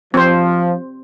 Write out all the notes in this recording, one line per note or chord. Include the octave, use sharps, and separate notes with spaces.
F3 C4 C5